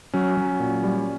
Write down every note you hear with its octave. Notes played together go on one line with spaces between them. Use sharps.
F#3 C#4
F#3
A#2
G3